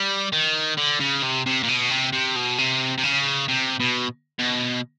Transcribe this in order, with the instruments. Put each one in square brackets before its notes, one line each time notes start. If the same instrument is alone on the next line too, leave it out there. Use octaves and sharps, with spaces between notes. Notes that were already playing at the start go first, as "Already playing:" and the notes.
Already playing: [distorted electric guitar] G3
D#3
D3
C#3
C3
C3
A#2
B2
C3
C3
B2
C3
C3
C#3
C3
B2
B2